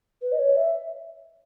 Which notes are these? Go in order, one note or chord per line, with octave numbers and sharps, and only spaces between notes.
B4
D#5
C#5
E5